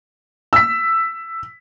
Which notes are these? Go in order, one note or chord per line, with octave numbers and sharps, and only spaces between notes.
E6 B6